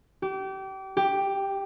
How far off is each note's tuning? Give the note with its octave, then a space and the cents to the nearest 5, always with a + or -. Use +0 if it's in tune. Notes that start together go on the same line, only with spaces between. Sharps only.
G4 -30
G4 +5